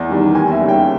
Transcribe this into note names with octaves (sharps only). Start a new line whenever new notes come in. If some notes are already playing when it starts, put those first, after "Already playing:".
Already playing: E2
D#3 G3
D#2 G#5
E5
C#3 G3
G5